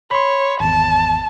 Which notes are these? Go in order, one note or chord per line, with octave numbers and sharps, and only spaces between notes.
C#5 B5 C6
G#1 E2 A5